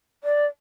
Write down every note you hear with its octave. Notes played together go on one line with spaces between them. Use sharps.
D5